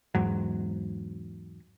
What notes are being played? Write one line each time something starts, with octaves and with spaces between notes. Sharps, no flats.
E2 G#2 F#3